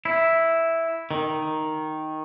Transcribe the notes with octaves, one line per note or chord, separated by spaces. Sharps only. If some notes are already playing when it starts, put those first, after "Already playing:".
E4
D#3